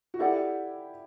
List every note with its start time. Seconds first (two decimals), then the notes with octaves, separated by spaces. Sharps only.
0.14 F#4
0.19 E4 G4 A4 D5 F#5